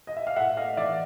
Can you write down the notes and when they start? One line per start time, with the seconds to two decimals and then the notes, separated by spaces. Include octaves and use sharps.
0.07 D#5
0.17 E5
0.27 F5
0.36 A2 E5 F#5
0.57 A3 D#5 F5
0.77 E3 D5 E5